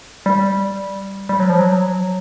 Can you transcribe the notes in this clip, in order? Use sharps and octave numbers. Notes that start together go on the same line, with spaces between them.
G3
G3
F#3
F3
F#3